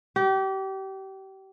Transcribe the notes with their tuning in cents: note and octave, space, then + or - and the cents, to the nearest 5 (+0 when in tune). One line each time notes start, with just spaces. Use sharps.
G4 -30